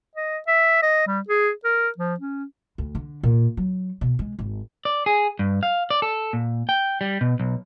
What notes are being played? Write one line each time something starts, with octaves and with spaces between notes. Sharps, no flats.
D#5
E5
D#5
G3
G#4
A#4
F3
C#4
D2
D3
A#2
F#3
B2
G#3
G#1
D5
G#4
G2
F5
D5
A4
A#2
G5
G3
B2
B1